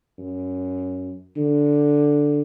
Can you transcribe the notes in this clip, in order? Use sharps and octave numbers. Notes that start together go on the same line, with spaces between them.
F#2
D3